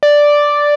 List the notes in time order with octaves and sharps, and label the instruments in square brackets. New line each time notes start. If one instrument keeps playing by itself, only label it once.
[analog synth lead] D5